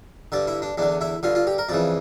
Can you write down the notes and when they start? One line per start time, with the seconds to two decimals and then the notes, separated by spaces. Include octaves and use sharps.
0.32 G2 D3 D5
0.47 E4
0.62 D4
0.78 E2 D3 D4
1.01 E4
1.23 G2 D3 F4
1.35 F4
1.47 G4
1.58 A#4
1.69 F2 C#3 E3 D5